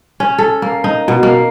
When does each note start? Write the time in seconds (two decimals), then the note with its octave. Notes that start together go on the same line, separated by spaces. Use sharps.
0.20 C#4
0.38 A4
0.62 A#3
0.84 D#4
1.08 B2
1.23 A#3